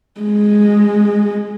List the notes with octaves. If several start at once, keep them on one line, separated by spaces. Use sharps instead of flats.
G#3